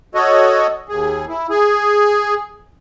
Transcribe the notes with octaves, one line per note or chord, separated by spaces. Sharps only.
F#4 A4 C#5 D#5
D#2 G#4
E4
G#4